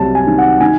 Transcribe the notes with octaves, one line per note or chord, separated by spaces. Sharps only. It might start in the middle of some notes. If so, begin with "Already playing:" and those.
Already playing: C2 C3 F#3 A5
G#5
D#3
F#5
D#3 G#5